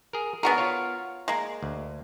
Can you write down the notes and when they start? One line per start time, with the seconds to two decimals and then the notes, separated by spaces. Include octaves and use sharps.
0.13 G#4 A#4
0.43 B3 D4 F#4 G#4 A#4
0.58 F4 C#5
1.28 G#3 A#3
1.63 D2